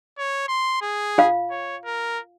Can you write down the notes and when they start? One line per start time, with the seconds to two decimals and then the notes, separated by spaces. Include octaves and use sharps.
0.18 C#5
0.48 C6
0.82 G#4
1.18 F4 F5
1.51 C#5
1.85 A#4